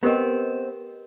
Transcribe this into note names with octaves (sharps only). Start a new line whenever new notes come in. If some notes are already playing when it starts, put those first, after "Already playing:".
B3 C4 G4 A#4 D#5